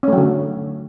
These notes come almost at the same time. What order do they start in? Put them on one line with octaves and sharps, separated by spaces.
C#4 A3 F#3 D3